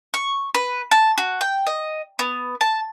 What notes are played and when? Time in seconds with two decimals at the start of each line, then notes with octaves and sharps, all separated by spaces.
0.14 C#6
0.54 B4
0.91 A5
1.18 F#4
1.41 G5
1.67 D#5
2.19 B3
2.61 A5